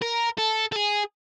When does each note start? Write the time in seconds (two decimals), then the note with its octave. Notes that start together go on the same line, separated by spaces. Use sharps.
0.02 A#4
0.38 A4
0.72 A4
0.76 G#4